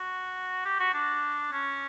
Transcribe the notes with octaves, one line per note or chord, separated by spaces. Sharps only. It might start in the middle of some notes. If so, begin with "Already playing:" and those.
Already playing: F#4
G4
F#4
D4
C#4